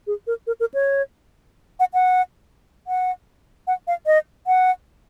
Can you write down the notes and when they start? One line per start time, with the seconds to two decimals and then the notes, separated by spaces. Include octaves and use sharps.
0.07 G#4
0.27 A#4
0.47 A#4
0.60 A#4
0.74 C#5
1.80 F#5
1.94 F#5
2.87 F#5
3.67 F#5
3.87 F5
4.06 D#5
4.47 F#5